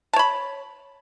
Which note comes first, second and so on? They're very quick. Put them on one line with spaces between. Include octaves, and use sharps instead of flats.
A5 C#5 B5